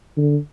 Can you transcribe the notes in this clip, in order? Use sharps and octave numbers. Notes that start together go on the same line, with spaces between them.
D3